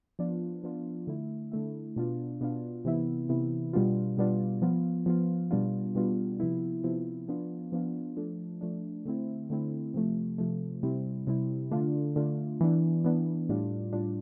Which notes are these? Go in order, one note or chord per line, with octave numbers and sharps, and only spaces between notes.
F3 B3 D4 F4
F3 B3 D4 F4
D3 A3 E4
D3 A3 E4
B2 B3 D4 F4
B2 B3 D4 F4
C3 E3 B3 E4
C3 E3 B3 E4
B2 G3 B3 D4 F4
B2 G3 B3 D4 F4
F3 B3 F4
F3 B3 F4
B2 G3 B3 D4 F4
B2 G3 B3 D4 F4
C3 F3 B3 E4
C3 F3 B3 E4
F3 B3 D4 F4
F3 B3 D4 F4
F3 A3 D4
F3 A3 D4
D3 A3 C4 E4
D3 A3 C4 E4
C3 F3 A3
C3 F3 A3
C3 G3 C4 E4
C3 G3 C4 E4
D3 A3 D4 F4
D3 A3 D4 F4
E3 B3 D4
E3 B3 D4
A2 G3 D4 F4
A2 G3 D4 F4